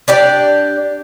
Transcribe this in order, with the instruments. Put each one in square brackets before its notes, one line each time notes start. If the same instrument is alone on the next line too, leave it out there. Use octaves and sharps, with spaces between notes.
[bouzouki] D4 G4 D5